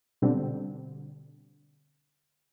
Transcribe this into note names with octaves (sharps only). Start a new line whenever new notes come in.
B2 D3 G3 C4